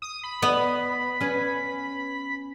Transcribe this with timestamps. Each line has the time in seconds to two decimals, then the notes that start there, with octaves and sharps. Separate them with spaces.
0.02 D#6
0.23 B5
0.42 B3 D#5
1.20 C#4 B4